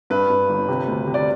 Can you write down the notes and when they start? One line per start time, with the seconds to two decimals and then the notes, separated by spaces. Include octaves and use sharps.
0.10 G2 B4
0.30 G2
0.49 G1
0.68 C3
0.88 D2
1.07 C3
1.14 D5